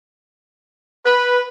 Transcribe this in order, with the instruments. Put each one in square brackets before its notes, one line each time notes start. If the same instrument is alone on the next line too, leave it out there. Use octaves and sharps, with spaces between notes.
[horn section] B4